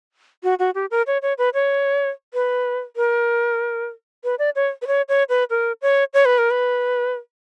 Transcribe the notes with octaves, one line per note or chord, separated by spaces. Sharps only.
F#4
F#4
G4
A#4
C#5
C#5
B4
C#5
B4
A#4
B4
D5
C#5
B4
C#5
C#5
B4
A#4
C#5
C#5
B4
A#4
B4